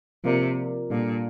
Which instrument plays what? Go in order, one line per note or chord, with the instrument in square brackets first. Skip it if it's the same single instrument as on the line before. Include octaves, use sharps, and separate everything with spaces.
[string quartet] C3 [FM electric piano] F3 A#3 F4 A#4 D5
[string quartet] A#2 [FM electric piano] G3 D4 A4 D5 F5